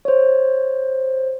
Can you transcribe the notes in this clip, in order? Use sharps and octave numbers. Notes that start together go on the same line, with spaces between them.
C5 C#5